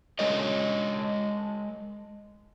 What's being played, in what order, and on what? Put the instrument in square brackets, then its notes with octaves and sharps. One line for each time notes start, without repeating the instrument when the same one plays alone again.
[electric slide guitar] G#3 A#4 C#5 D#5